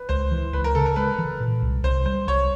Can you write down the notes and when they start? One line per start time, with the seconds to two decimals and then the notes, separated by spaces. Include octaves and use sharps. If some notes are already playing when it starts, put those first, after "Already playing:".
Already playing: B4
0.09 C#2 C5
0.31 E3
0.53 C#2 B4
0.64 A#4
0.75 C#3 A4
0.86 A#4
0.96 G#3 B4
1.19 E3
1.40 A#2
1.62 C2
1.83 C2 C5
2.06 G3 C5
2.27 C2 C#5